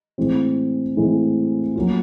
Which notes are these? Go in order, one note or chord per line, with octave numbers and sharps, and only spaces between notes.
A2 E3 G#3 C4
A2 E3 G#3 C4
F#3 A#3 C#4 F4